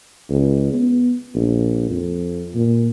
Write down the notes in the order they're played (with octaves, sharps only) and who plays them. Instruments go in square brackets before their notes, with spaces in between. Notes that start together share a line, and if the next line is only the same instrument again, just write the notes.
[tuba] C#2
B3
A#1
F2
A#2